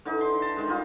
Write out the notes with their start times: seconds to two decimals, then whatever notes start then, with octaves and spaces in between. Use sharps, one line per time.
0.05 D3 E3 D#4
0.21 C6
0.42 A5
0.56 D#3 G#3
0.68 G3 D#4 F4